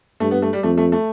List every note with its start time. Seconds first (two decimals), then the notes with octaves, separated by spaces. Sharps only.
0.20 G2 A3
0.31 B3
0.42 A3
0.53 G3
0.63 F2 A3
0.77 A3
0.92 A3